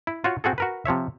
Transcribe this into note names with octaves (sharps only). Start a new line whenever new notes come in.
E4
F4 F#4 C#5
C4 F#4 G#4 A4
F#4 A#4 B4
C3 F3 C#5 E5